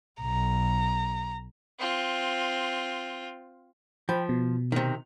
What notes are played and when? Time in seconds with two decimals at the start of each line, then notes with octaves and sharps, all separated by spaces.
0.21 B1 A#5
1.79 C4 F4
4.09 F3 G5 B5
4.29 B2
4.72 C3 D#3